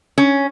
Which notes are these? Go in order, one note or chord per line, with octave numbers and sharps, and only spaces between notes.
C#4